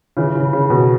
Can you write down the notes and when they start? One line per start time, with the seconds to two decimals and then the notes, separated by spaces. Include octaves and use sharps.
0.17 C#3 E3
0.35 C#3
0.53 C#3
0.70 B2